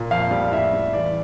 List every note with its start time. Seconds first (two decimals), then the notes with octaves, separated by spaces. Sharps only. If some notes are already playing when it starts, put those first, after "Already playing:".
Already playing: A#2
0.11 F2 F5
0.31 G3
0.52 A2 E5
0.73 G3
0.93 E2 D5